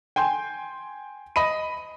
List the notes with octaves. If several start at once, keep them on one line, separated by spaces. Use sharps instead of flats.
G5 G#5 C6 G6
D#5 B5 D#7